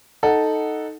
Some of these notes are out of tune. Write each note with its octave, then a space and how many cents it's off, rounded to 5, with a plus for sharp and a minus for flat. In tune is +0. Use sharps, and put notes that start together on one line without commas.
D#4 +0 A4 +0 F#5 +0